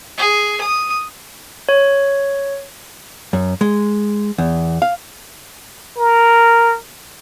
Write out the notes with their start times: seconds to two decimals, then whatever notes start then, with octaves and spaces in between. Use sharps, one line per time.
0.18 G#4
0.61 D#6
1.69 C#5
3.33 F#2
3.61 G#3
4.38 E2
4.82 F5
5.97 A#4